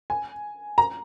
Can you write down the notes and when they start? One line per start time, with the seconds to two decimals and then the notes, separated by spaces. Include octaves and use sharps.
0.10 G#5
0.78 A#5